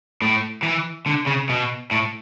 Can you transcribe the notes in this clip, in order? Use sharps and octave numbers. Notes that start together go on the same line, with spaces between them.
A2
E3
D3
C#3
B2
A2